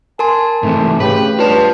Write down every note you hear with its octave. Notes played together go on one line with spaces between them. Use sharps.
A#4 G#5 A5 C6
G#2 C3 E3 A3
C#3 A3 G4 B4
G2 F4 C#5 A5